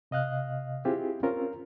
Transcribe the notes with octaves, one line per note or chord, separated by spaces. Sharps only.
C3 D#5 F5 F#6
C4 E4 F4 G4 G#4
C4 C#4 F4 A#4